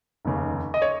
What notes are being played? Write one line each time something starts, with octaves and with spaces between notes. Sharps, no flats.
F1 D#2 C#3
D#5
C#5